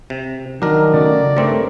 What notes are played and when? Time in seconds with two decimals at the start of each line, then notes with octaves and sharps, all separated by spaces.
0.10 C3
0.62 D#3 F#3 D4 A#4
0.93 C#3 A3 F#4 D5
1.37 G2 A3 C4 A#4 C#5